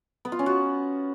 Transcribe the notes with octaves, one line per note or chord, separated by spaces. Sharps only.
B3
F4
C#4
F#4